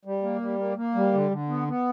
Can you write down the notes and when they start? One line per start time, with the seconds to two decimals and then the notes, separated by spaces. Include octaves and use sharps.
0.05 G3
0.23 A#3
0.41 G3
0.59 A#3
0.77 A#3
0.95 G3
1.13 D3
1.31 D3
1.49 B3
1.68 B3